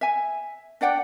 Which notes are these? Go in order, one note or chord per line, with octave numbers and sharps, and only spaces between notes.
E5 G#5
D4 D5 F#5 G5